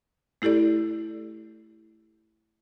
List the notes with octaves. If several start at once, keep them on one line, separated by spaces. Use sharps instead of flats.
A3 E4 G4 A4 D5